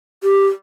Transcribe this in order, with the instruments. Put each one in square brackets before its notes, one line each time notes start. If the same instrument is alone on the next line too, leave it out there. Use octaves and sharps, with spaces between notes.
[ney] G4